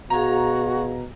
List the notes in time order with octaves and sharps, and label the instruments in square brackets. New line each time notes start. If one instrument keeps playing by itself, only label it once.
[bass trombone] B2 [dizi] F#4 [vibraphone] G#4 F5 [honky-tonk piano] A#5